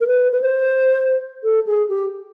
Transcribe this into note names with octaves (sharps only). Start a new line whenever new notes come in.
A#4
B4
B4
C5
A4
G#4
G4